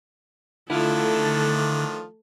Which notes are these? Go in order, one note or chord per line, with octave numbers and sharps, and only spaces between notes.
D3 D#3 F3 A3 D4 E4 F4 A4